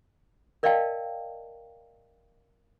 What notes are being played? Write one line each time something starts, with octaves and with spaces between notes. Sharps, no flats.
A#4 D5 D#5 F5 G5 A5